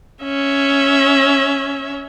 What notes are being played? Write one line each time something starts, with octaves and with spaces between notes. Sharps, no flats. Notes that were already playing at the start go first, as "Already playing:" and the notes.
C#4 E5